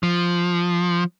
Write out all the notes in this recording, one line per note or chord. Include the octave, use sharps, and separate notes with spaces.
F3